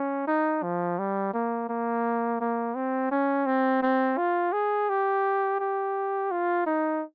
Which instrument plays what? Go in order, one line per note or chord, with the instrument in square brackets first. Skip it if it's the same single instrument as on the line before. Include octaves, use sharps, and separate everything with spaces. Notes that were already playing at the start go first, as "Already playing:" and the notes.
Already playing: [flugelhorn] C#4
D#4
F3
G3
A#3
A#3
A#3
C4
C#4
C4
C4
F4
G#4
G4
G4
F4
D#4